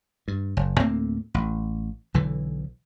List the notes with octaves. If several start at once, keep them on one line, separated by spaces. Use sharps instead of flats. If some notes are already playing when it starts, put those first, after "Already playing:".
G2
F#1
D2 A2 A#3 C4
A1
B1 D3 E3